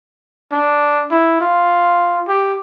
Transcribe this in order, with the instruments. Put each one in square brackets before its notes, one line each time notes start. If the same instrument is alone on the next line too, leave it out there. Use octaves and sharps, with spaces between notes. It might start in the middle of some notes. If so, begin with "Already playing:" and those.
[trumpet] D4
E4
F4
G4